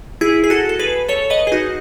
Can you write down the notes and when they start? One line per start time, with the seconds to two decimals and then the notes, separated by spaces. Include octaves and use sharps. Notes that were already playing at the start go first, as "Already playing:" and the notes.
0.21 E4 G#4
0.44 G#4
0.50 F#4 A4
0.69 A4
0.79 G#4 B4
1.09 A4 C#5
1.30 B4 D#5
1.47 G#4
1.52 D#4 F#4